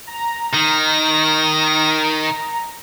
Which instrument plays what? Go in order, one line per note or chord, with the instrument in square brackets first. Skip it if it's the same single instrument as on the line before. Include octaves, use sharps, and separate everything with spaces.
[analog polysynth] A#5
[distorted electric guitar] D#3 [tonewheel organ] A#6